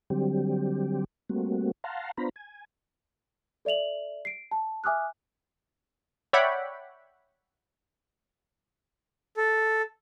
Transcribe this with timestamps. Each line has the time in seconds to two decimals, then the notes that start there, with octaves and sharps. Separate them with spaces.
0.10 D3 F#3 G3 C4 G4
1.29 G3 A3 A#3 C4 F#4
1.84 F5 F#5 A5 A#5 C6
2.17 B3 D4 F4 C5 A#5 B5
2.36 G#5
3.65 A4 D5 E5 F7 F#7
4.25 C7 D7
4.51 A5
4.84 E5 G#5 D6 D#6 F6 F#6
6.33 C#5 D5 E5 F#5 G5 B5
9.37 A4